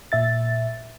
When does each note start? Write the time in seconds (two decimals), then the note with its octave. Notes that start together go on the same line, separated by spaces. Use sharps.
0.12 A#2 E5 A6